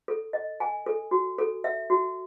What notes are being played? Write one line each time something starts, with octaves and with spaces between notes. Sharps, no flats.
A4
D#5
G#5
A4
F#4
A4
E5
F#4